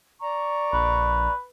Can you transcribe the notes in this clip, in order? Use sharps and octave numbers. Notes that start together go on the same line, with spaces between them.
D5 A#5 C#6
A#1 B4